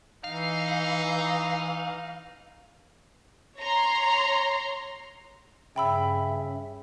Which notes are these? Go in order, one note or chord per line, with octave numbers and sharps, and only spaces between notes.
E3 D#4 F5
C#5 A#5 C6
G2 C#3 E5 G5 B5 E6